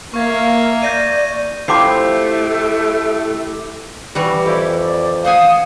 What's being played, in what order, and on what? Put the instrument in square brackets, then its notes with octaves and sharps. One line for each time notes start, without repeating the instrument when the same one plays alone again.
[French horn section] A#3 [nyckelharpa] E5 F5 [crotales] C#6 G#6
[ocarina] D5 [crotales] G6 A#6 D#7
[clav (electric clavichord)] F3 C4 [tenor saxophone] A3 [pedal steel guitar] E4 G4 [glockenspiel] D6 C7
[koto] E3 F#4 [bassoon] G3
[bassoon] F2 [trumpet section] E4 [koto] G4
[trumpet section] D5
[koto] C5 F#5 G#5 [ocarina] F5 [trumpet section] D#6